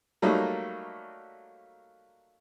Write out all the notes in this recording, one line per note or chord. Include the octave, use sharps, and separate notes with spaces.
F#3 G3 A3 A#3 D#4